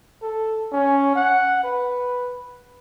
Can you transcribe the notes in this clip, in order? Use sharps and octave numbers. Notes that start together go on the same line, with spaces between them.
A4
C#4
F#5
B4